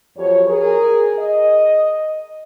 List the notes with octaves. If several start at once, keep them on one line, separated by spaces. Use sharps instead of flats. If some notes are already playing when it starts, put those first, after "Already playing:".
F2 F#3 G4 C#5
G#4 A#4
D#5